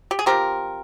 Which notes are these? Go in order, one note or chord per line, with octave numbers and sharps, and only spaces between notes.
G4
G#4
F3 G#3 C4 G4 A#4